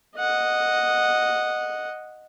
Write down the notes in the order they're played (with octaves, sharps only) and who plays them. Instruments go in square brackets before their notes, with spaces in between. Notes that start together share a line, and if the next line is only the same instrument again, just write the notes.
[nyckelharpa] D#5 F#5